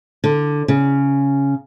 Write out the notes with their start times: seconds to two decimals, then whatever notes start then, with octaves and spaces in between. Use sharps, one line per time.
0.24 D3
0.68 C#3